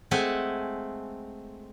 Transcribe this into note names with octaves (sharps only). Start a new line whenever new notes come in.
G#3 A3 C4 E5 F#5 G#5